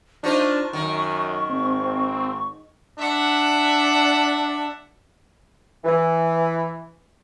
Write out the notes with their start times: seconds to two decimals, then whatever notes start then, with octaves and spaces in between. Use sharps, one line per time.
0.24 D4 D#4 F4 C5 C#6
0.73 F#2 D#3
1.50 G#1 C4
2.98 D4 E5 F#5
5.85 E3